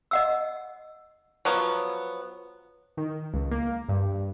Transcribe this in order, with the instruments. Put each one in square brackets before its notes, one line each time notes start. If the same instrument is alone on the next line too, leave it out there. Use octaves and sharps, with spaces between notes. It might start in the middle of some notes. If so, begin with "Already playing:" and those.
[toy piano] D#5 F#5 E6
[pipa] F3 F#3 B3
[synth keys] D#3
C#2
A#3
G2